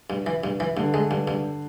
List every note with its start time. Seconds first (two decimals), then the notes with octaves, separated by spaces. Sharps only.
0.10 G2
0.27 E3
0.44 G2
0.60 E3
0.77 G2 D3
0.94 G#3
1.11 G2
1.28 G2